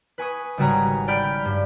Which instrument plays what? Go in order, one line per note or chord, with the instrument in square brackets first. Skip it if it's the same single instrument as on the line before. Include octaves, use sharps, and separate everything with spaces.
[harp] B4 G#5 C#6 D#6
G#1 C#3 G3 F#4 G#5 A#5
D5 G5 B5 F6 G6
G2